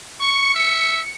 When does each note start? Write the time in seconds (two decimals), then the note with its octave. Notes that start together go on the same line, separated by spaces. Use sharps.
0.20 C#6 C#7
0.55 E5